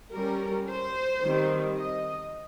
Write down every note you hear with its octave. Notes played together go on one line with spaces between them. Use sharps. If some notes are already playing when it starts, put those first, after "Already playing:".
G3 C#4 A#4
C5
D#3 G3 C4
D#5